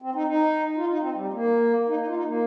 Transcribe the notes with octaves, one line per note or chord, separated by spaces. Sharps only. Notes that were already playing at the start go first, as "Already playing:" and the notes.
C4
D#4
D#4
F4
D#4
C4
G3
A#3
D#4
D#4
F4
D#4
A#3